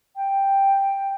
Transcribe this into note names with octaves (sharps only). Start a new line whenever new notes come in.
G5